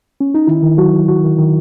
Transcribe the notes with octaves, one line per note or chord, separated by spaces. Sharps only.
C#4
D#4
D#3 E4
D#3
F#3 F#4
F#3
D#3 F#4
D#3
D#3